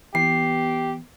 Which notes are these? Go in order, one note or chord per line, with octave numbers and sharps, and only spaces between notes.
E3 B3 G4 C7